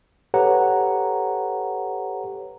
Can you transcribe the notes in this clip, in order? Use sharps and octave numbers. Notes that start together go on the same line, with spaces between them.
G4 A4 B4 C#5 F#5 A#5